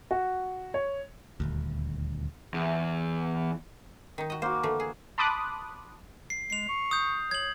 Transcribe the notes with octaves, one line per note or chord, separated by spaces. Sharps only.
F#4
C#5
D#1 G#1 D2
E2
D#3 D#4
F#4 D#5
A#3 F#4 C5
D3 E3 A3
G#4
A5 B5 C6 D6 D#6 F#6
C7
G#3 C7 F7
C#6
D#6 G6
C#5 G#6 F#7